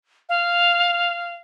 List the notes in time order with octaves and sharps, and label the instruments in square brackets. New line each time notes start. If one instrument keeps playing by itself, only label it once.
[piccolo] F5